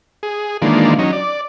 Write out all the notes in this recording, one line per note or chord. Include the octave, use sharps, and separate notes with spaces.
G#4
D#3 E3 G#3 A#3 D4 F4
F#3 C#4 D#4
D5